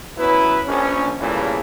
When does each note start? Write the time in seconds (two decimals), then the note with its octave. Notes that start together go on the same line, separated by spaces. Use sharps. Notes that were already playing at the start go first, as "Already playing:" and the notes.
0.18 F#3 B3 C#4 E4 B4
0.66 A#1 C#4
1.20 E2 A#2 C#3 E3 G3 A3